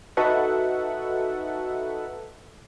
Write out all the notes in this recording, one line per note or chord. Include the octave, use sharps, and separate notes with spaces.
D#4 F#4 A4 B4 E5 F#5